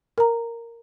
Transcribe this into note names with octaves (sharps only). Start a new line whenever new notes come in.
A#4 A#5